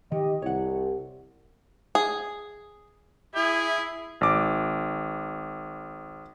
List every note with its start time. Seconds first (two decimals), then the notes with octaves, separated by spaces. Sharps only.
0.12 D#3 G4 D#5
0.42 C2 C#5 F#5
1.95 G#4
3.35 E4 G#4
4.21 G#1 D6